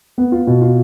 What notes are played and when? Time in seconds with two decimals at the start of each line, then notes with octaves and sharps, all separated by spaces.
0.18 B3
0.32 F4
0.47 B2
0.62 F4